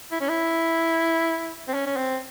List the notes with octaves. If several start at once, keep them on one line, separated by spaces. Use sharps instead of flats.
E4
C#4
E4
C4
C#4
C#4
C4